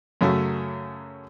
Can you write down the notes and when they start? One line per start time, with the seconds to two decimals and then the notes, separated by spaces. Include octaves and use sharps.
0.21 F#2 C#3 F#3 A3